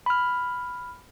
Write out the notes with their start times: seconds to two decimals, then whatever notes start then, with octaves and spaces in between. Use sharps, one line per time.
0.06 B5 F6